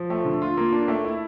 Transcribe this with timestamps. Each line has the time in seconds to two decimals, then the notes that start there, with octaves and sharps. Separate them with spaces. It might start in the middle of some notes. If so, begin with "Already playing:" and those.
Already playing: F3
0.10 A3
0.25 D3
0.42 F4
0.57 A#3
0.73 D4
0.88 A3
1.05 E4